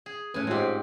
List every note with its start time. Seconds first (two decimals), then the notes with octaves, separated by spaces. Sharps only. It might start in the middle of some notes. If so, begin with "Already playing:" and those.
0.06 G#4
0.34 A2 A3 C#4 B4 G#5
0.47 G#2 G#3 C4 F4 G4